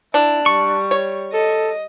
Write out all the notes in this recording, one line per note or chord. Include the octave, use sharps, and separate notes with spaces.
D4 E4
G3 C#6
C#5
A4 D#5